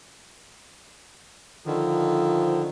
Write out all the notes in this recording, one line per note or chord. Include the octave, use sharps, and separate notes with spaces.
D3 D#3 F3